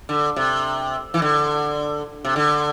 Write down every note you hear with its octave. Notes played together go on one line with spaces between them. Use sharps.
D3
C3
E3
D3
C3
D3